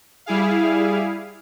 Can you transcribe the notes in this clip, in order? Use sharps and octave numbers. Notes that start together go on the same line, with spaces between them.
G3 E4 G#4 F5